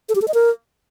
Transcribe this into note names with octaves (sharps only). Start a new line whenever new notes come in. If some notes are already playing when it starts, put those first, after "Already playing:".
A4
G4
A4
D#5
A#4